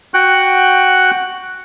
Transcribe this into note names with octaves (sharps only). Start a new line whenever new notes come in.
F#4 F#5 G5 F#6